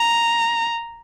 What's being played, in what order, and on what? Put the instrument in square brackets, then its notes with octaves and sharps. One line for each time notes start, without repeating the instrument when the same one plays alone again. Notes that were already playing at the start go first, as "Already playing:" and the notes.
Already playing: [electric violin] A#5